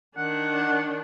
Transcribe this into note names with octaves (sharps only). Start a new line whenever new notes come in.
D#3 D4 F#5